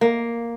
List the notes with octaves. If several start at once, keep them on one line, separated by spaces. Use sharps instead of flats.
A#3